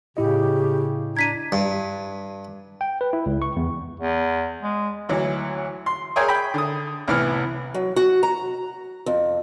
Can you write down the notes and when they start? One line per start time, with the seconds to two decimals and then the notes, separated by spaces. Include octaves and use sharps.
0.17 A2 C#3 E4 G4 D#5
1.17 D4 A#5 G#6 B6 D#7
1.52 G2
2.81 G5
3.01 B4
3.13 E4
3.26 C#2
3.42 C#6
3.56 E2
4.00 E2
4.62 G#3
5.09 D2 E3 F#3
5.86 C6
6.16 G#4 A#4 C#5 E5 G5 G#5
6.28 G5 B5
6.54 D3 D#6
7.08 C2 A2 E3 B3 F6
7.74 F#3
7.96 F#4
8.23 A#5
9.06 F2